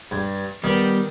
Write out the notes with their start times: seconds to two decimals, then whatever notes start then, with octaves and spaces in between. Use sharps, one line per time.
0.11 G2
0.64 D#3 G3 B3